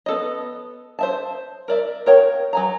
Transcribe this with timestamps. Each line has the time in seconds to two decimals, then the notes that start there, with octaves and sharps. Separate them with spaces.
0.06 B3 A4 D#5
0.99 C5 E5 A5
1.68 A#4 D5 E5
2.06 A#4 C#5 G5
2.53 F#3 G#5 A#5